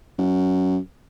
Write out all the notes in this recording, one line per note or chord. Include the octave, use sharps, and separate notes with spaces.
F#2